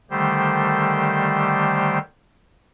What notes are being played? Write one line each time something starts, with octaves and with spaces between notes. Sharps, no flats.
D3 D#3 G3 A3 G4 C5